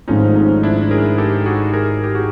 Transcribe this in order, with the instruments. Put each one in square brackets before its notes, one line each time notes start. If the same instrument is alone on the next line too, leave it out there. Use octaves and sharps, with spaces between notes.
[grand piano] G#1 G#2 F3 A3 [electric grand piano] C#4 D#4
[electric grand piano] C#4 D#4
D4 E4
G#4 A#4
G4 A4
F#4 G#4
G#4 A#4
G4
F#4 G#4